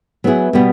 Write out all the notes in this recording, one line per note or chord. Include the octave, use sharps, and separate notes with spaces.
F#3 B3 E4 G#4
B2 G3 B3